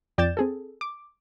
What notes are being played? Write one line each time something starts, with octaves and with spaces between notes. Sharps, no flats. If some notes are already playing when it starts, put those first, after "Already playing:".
F2 D5 G5 G6 A6 E7
C4 G#4 A4
D6